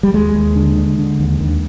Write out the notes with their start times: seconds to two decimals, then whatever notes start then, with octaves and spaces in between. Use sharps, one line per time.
0.03 G3
0.14 D#2 G#3
0.35 D#2
0.56 D3
0.77 D3
0.98 D3
1.19 D#2
1.40 D#2